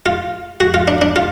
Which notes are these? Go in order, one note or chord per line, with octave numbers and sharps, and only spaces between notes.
F4
F#4
F4
D4
D4
F4